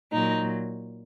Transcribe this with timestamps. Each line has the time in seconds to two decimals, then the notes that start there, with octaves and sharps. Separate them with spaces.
0.12 A#2 F#3 D#4